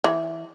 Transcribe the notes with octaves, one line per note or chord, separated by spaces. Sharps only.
E3